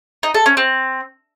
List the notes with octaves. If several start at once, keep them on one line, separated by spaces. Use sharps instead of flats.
D#4
A4
C#4
C4